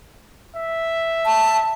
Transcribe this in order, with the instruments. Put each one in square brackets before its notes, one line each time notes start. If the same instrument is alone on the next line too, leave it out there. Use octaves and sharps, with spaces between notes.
[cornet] E5
[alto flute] A5